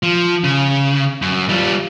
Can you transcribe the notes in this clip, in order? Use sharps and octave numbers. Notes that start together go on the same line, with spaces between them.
F3
C#3
F#2
G3 F4